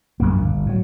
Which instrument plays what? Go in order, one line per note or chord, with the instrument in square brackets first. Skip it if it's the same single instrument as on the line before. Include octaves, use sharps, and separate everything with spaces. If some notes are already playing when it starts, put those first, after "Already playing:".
[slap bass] A#1 F#2 A#3
G1
A2 F#3